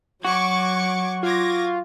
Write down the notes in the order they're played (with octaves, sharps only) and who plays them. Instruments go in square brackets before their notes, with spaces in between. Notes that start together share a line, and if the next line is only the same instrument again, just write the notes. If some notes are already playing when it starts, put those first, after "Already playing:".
[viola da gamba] F#3 [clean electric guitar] F#4 [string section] C#6 D6 G#6
[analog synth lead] F4 [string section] D6 G#6 A#6